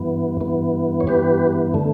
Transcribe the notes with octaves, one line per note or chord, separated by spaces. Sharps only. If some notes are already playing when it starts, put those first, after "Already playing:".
Already playing: G2 E3 B3
G2 E3 B3
C#5
G2 E3 B3 G4 B4
D3 A3